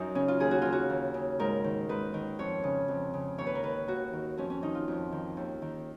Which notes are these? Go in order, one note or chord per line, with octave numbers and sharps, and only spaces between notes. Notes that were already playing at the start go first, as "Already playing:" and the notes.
Already playing: F#2 D#4
C#3 C#4
F4
D#2 G#4
F#4
C#3 F4
F#4
D#2
C#3
G#2 A#4
D#3
G#2 B4
D#3
F2 C#5
C#3
F2
C#3
D#2 C#5
B4
A#4
D#3 B4
D#2 F#4
D#3
F2 C#4
C#4
D#3 D#4
F4
F2
D#3
D#2
D#3